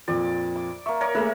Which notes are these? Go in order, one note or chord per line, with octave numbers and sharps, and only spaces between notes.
F2 A#2 D5
D6
A#3 E5 C#6
A#4 C#5 D5
A3 A#3 G#4 A#4 E5